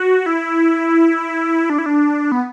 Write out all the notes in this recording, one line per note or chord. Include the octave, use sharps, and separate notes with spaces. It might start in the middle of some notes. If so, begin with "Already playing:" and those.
Already playing: F#4
E4
D4
E4
D4
B3